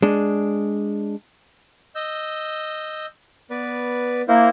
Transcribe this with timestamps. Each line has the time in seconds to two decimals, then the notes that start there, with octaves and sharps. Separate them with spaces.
0.02 G#3 D4
1.95 D#5 E6 G6
3.50 B3 B4 D5
4.28 A#3 E4 A#4 C5